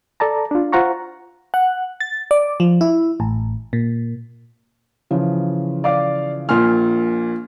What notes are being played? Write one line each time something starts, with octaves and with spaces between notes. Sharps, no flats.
A4 D5 A5 A#5
D4 F4
F4 C5 F#5 A#5 C#6
F#5
A6
D5
F3
E4
A1
A#2
C#3 E3 F3
D5 F5 D6
A#1 A#2 G#5 C6 F6